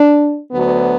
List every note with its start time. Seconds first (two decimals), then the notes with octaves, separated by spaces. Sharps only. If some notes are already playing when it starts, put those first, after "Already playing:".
Already playing: D4
0.52 D2 D3 F#3 B3